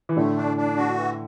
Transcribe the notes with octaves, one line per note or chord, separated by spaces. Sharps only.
E3
A2 D3 A3
D4
D4
F#4
E3